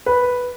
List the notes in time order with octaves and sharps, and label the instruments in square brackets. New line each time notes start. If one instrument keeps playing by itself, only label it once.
[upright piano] B4